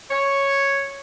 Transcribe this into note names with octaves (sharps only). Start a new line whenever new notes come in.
C#5